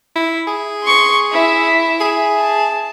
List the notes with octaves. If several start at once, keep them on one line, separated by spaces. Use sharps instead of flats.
E4
G#4
C6 C#6
E4 E5
G#4
A5